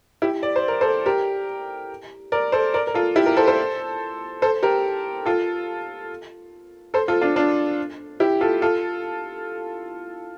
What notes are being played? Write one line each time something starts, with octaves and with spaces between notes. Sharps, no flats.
E4 G4
D5
C5
A#4
A4 C5
G4 A#4
A#4 D5
A4 C5
A#4 D5
A#4
F4 A4
E4 G4
G4 A#4
A4 C5
A4 C5
A4 C5
G4 A#4
F4 A4
A4 C5
F4 A4
D4 F4
D4 F4
E4 G4
F4 A4
F4 A4